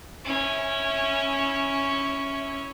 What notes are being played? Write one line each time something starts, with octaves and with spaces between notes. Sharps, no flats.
C#4 E4